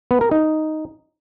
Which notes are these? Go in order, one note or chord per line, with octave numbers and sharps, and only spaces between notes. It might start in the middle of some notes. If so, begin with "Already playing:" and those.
B3
A#4
D#4